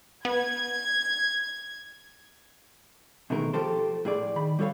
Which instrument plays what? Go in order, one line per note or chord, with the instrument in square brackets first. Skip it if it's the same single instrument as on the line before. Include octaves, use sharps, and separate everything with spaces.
[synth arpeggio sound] B3 [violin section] G#6
[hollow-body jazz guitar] B2 D#3 E3 G#3 A3 A#4
F3 F4 G4 A4 C5
A2 G#4 D5
D#3 B5
G3 F#4 A4 C#5 F5